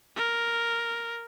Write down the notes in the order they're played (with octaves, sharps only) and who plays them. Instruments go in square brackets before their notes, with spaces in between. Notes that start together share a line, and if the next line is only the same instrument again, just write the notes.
[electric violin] A#4